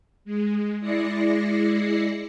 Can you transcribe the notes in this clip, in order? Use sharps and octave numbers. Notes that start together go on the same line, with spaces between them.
G#3
G#3 E4 D5 A#6 C7 C#7